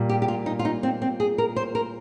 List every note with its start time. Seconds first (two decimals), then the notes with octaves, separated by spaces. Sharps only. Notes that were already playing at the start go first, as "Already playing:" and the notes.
Already playing: A#2 G3
0.09 G4
0.22 G4
0.28 F4
0.46 D#4
0.59 F4
0.65 D#4
0.83 C4
1.02 C4
1.20 G#4
1.38 A#4
1.56 C5
1.75 A#4